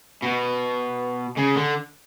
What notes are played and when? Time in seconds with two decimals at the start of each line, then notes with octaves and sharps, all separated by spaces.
0.22 B2
1.37 C#3
1.56 D3